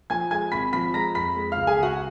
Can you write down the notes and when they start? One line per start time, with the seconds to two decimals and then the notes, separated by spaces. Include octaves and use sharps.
0.10 F3 G#5 G#6
0.31 G#3 G#5 G#6
0.52 G#1 B5 B6
0.73 F3 B5 B6
0.94 G#3 A#5 A#6
1.15 F2 B5 B6
1.36 G#3
1.52 C#2 F5 F6
1.67 G#4 G#5
1.78 C#2 F#4 F#5